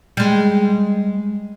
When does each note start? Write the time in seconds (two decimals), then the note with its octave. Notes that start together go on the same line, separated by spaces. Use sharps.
0.17 G3 G#3